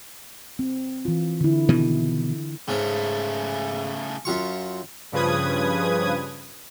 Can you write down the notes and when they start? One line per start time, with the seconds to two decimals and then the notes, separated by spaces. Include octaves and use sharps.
0.59 C4
1.05 E3 F4
1.41 D3 E4
1.69 B2 D#3 E3
2.68 G#2 C#3 A3 C#4
4.25 F#2 F4 C#6
5.12 G2 C#3 F3 B4 D#6 G#6